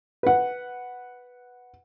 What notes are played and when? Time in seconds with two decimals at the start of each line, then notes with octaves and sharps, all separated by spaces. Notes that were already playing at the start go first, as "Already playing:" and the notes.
0.23 B4 F#5